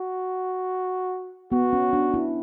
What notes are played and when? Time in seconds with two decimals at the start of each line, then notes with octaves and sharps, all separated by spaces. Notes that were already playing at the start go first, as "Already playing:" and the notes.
Already playing: F#4
1.52 B3 F#4
1.73 C#4
1.93 D4
2.14 E4